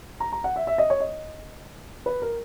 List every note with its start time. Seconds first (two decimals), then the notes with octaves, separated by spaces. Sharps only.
0.20 A#5
0.32 A#5
0.44 F#5
0.56 E5
0.67 E5
0.78 D#5
0.90 C#5
1.00 D#5
2.06 B4
2.22 A#4